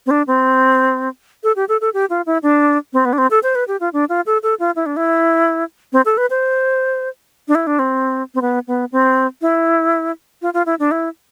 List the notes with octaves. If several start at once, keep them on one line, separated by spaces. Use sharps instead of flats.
C4
D4
C4
A4
G4
A4
A4
G4
F4
E4
D4
C4
B3
D4
C4
A4
C5
B4
G4
F4
D4
F4
A4
A4
F4
E4
D4
E4
C4
A4
B4
C5
D4
E4
D4
C4
C4
B3
B3
C4
E4
F4
F4
E4
D4
E4